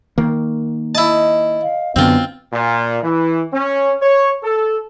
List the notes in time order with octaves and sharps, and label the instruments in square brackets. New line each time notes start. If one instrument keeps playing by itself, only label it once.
[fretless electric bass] D#3 A#3
[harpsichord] E4 A5 [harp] D#5
[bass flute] F5
[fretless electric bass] F#2 D3 [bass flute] B3 [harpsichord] C4 F4
[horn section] A#2
E3
C#4
C#5
A4